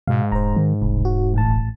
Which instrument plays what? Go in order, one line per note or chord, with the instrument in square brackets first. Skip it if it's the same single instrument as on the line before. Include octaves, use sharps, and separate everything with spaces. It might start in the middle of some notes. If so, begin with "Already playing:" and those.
[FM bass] G#2 [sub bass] B2 [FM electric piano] F5
[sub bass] E1 [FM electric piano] C5 A#5
[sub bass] D#3
[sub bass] E1 [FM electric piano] C2
[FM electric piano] F#4
A1 A2 A5